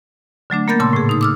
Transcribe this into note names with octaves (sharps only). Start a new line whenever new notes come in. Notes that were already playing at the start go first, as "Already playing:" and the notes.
D3 F#3 A3 D4
A#3 B3 A#4 B5 G6 A6
A#2 C#3 A5 C6 E6
A2 G#4
D#4 D#6
D6 E6 F6